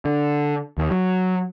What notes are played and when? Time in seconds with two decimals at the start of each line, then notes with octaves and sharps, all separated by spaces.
0.05 D3
0.78 D#2
0.91 F#3